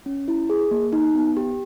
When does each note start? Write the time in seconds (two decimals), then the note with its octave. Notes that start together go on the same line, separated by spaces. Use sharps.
0.06 C#4
0.28 E4
0.50 G#4
0.71 A#3
0.93 D#4
1.15 B3
1.37 G4